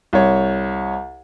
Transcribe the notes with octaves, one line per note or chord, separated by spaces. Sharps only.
C2 C#5